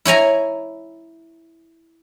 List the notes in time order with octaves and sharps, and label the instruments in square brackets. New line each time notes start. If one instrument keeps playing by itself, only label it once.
[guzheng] E4 C#5 G#5 A#5